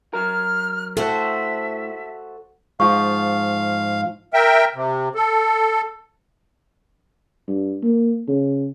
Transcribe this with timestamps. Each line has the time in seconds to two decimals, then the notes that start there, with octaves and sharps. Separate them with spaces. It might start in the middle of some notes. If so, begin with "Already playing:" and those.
0.13 F#3 A#4 F6
0.97 A2 A3 F#4 A4 C5 E5
2.80 G#2 F3 F5 C#6
4.34 A#4 E5 G5
4.75 C3
5.15 A4
7.48 G2
7.83 A#3
8.28 C#3